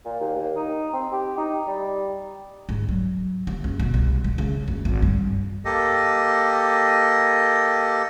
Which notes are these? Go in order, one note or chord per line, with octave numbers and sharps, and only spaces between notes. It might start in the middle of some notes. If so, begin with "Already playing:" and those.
A#2
D#2
D#2
D#4
C4
G4
D#4
G3
G#2
F#3
D#2
F#1
B2
C2
G#3
C#3
F#1
G#1
G2
A#3 G4 A4 D#5